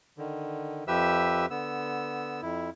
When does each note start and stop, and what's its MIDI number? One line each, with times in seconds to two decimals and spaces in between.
0.18 0.84 50
0.18 0.84 51
0.87 1.46 41
0.87 1.46 53
0.87 1.46 67
0.87 1.46 71
0.87 1.46 76
0.87 1.46 88
1.50 2.41 50
1.50 2.41 59
1.50 2.41 88
2.42 2.70 41
2.42 2.70 64